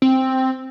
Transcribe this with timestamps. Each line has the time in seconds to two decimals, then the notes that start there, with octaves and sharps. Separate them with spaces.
0.02 C4